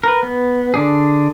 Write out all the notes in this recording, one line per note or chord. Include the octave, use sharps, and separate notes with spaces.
A#4 B4
B3
D3 D4 G#4